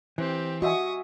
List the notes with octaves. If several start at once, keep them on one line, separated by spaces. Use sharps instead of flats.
E3 C4 G4
F#4 D#5 E5 G#5 C#6 D#6